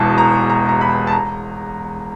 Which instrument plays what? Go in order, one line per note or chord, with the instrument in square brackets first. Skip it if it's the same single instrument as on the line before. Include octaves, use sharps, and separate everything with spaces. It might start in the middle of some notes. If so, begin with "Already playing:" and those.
Already playing: [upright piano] E1 E2 B2 A5
A#5
A#5
A#5
B5
A5
A#5